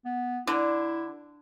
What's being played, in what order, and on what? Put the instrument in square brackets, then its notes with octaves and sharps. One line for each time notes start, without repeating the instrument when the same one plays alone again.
[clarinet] B3
[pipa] D3 [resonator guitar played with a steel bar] D4 [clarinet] E4